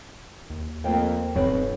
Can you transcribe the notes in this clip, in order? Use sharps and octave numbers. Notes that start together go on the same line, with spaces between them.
D#2
F2 A#3 G5
D1 B1 F#2 C4 B4 C#5